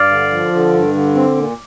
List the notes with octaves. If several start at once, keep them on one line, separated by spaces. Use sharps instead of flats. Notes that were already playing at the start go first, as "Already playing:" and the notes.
Already playing: G2 D5 F5
D3
F3
D3
G2
D3
C4
A#2